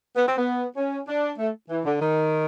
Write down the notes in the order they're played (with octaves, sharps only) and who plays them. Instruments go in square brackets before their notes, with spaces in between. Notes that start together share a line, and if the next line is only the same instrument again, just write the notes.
[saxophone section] B3
C4
B3
C#4
D4
A3
E3
D3
D#3